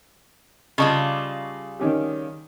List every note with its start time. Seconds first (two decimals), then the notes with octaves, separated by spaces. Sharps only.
0.78 C#3 G3 F4 D#5 A5 C#6
1.80 D#3 C#4 G4